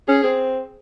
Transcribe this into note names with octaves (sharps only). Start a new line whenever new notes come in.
C#4 G#4
C4